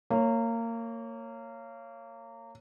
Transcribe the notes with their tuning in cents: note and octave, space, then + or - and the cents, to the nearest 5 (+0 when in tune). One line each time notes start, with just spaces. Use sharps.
A#3 -25 C#5 -5